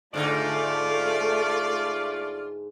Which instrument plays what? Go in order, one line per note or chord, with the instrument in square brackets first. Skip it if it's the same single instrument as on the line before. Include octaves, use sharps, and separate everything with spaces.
[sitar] G#2 D3 D#4 [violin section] A3 [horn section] F4 D5